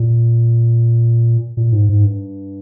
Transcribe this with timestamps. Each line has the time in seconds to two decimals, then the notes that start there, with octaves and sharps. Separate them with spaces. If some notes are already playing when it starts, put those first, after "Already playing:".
Already playing: A#2
1.57 A#2
1.72 G#2
1.89 G#2
2.04 G2